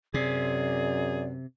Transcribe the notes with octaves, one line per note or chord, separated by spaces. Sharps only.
F#2 C3 G#4 D5